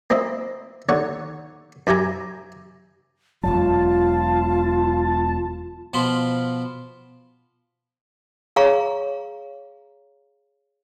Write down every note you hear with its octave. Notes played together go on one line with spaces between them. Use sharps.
A#3 C4 E4 D#5
D#2 D3 C#5 F#5 C#6
F#2 E4 G4 G#5 A#5
E1 C2 F#3 F4 A5
B2 F3 F4 B5 C6
G#4 C#5 F5 A#5 C#6